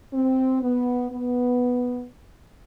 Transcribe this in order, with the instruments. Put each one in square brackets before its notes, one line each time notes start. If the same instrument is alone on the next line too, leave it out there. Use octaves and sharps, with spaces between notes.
[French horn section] C4
B3
B3